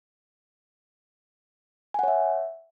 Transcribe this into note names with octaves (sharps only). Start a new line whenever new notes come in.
C#5 E5 F#5 G#5